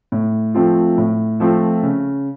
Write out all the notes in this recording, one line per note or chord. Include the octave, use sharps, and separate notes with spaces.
A2
F3 A3 C4 F4
A2
F3 A3 C4 F4
C#3